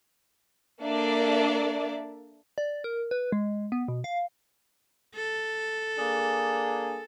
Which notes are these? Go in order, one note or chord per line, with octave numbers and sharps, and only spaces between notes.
A#3 D4 A4 D5 E5
D5
A#4
B4
G#3
B3
B2
F5
A4
A#3 D4 G#4